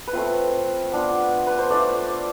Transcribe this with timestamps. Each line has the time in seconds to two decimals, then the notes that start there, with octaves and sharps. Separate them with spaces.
0.07 B4
0.13 A3 C4 F4 C5
0.91 B3 D4 F4
1.47 B4
1.59 C5
1.70 A3 D4 F4 D5